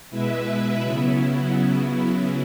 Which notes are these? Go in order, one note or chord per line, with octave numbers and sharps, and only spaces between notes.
B2 G#3 E4 B4 E5
C#3 F#3 B3 E4
C#3 F#3 B3 E4